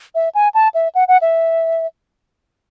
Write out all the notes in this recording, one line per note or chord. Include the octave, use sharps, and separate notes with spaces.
E5
G#5
A5
E5
F#5
F#5
E5